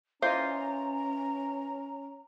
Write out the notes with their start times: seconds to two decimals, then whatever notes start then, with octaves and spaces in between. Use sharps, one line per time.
0.22 E3 C#4 F4 C5 D#5 A#5